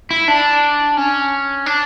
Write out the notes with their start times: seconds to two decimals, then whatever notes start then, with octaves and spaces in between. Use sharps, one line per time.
0.11 E4
0.28 D4
0.97 C#4
1.66 D4